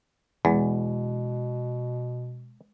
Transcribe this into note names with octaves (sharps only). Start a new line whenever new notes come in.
E2 B2 G#3